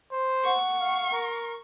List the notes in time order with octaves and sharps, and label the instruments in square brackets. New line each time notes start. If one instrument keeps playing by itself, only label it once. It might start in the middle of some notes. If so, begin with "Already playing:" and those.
[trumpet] C5
[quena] F#5 [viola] C#6
[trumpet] F5
A#4